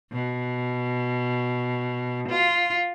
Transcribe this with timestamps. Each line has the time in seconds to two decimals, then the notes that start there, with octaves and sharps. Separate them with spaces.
0.12 B2
2.28 F4